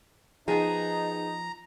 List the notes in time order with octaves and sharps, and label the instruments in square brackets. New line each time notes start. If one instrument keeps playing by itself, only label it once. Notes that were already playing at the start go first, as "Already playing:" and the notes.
[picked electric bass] F3 [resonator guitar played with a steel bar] B3 G#4 [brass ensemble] D#4 [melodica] A#5